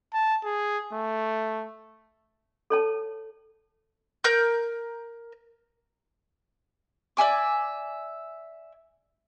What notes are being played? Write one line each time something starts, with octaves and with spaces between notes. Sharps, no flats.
A5
G#4
A3
A4 C#5 A5
A#4 G6
D5 E5 G#5 D6